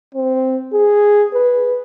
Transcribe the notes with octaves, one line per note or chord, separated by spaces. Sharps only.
C4
G#4
B4